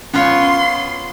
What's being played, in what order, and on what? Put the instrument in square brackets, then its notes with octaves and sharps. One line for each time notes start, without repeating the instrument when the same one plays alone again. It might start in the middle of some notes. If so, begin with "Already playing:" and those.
[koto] B3 F4 C#5 [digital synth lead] C#4 [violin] C6